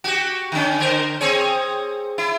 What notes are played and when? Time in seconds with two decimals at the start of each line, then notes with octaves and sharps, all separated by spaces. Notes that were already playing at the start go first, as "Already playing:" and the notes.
0.04 F#4 G4
0.52 D3 C#4
0.78 D3 A#4 C5
1.21 C4 G#4 C#5
2.18 E4